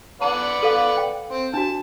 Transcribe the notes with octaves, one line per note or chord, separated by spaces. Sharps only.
B4 D5 F#5 A5
A4 F5
G5
C4
D4 F#4 A5